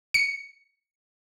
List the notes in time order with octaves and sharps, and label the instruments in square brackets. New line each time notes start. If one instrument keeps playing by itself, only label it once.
[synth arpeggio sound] C#7